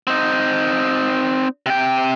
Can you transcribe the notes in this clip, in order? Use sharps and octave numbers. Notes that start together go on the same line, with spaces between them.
C4 D#4
C3 G5